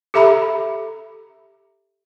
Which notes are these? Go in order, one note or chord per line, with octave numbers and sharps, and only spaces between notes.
G4 A4 E5 A#5 B5